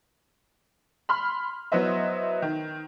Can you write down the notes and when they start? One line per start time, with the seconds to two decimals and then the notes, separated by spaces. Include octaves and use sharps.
1.09 B5 C6 F6
1.72 F#3 B3 E4 C5 D#5 E5
2.42 D#3